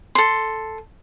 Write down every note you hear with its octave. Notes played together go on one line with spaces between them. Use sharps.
A4 C6